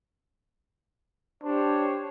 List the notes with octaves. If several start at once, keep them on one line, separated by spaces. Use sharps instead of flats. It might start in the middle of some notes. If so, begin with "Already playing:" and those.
D4 G4 C5 C#5